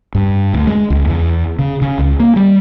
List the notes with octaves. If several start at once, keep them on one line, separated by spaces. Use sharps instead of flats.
G2
D2
G#3
C#2
E2
C#3
C#3
C#2
A#3
G3